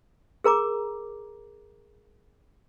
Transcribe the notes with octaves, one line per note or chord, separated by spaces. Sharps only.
G#4 A#4 A#5 D6